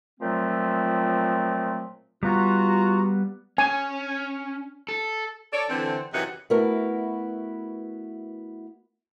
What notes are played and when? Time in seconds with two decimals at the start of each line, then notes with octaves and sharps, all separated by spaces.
0.20 A#2 F3 F#3 A3 C4
2.23 G3 B3 F4 F#4 A#5
3.58 C#4 G#5
4.88 A4
5.52 A4 C#5 D5
5.69 D3 E3 C4
6.13 F#2 C3 E3 D#4 F#4 F#5
6.50 A3 B3 E4 F#4 A#4 B4